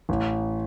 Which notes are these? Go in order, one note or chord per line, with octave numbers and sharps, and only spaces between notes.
A1